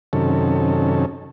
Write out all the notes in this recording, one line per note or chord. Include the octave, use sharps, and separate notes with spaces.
F#2 C3 D#3 C#4 A4